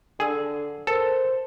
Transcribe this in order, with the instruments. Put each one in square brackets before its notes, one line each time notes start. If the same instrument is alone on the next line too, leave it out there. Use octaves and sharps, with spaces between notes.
[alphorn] D3 [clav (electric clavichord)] G#4 [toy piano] G5 B5 E6
[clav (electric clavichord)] A4 [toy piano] A#4 A5 [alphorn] C5